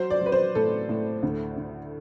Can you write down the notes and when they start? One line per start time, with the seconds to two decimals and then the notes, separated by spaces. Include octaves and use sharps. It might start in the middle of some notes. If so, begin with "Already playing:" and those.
Already playing: F#3 C5
0.10 D5
0.21 F#3
0.26 B4
0.32 C5
0.55 A2 A4
0.89 A2
1.23 D2
1.57 D3